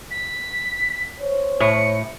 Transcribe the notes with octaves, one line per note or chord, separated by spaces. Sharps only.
B6
C5 C#5
A2 C#7